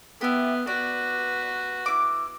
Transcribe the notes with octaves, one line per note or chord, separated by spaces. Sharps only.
B3 E4 G4
F#4 B4 D5
E4 D6